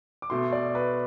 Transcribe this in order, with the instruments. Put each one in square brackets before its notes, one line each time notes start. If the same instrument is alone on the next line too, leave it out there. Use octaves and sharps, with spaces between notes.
[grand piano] D6
B2 A3 C6
D5
B4